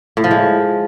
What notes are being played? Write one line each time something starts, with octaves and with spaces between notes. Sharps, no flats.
A2
F3
G#3